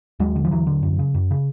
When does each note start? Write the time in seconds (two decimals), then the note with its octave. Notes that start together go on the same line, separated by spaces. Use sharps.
0.20 D#2 F#3 G#3
0.36 D3
0.45 F3
0.51 D#2 E3 F#3
0.67 D3
0.83 F#2
0.99 C#3
1.15 F#2
1.31 C#3